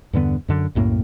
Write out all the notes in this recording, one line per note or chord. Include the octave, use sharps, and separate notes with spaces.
E2 G2 D3 B3
F#2 D3
C2 F#2 A2 A#3